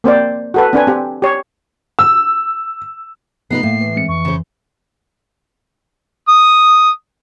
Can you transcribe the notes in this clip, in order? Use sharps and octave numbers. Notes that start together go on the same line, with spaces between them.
A#3 C4 C5 D5
F#4 A4 B4
C4 D4 B4 G#5
C4 G4
G4 C#5
E6
C3 A3 B3 D#4 B4 C7
A2 A3 A#3 F5
E3
G#3 C4 C#7
F2 C#6
C#3 C5
D#6